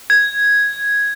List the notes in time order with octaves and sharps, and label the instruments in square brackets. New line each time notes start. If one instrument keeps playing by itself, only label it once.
[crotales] G#6